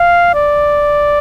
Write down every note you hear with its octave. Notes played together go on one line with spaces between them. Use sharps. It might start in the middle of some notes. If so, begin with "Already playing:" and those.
Already playing: F5
D5